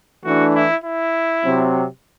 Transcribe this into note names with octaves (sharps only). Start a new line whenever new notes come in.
E3 A3 D4 F#4
E4
E4
C3 F#3 C4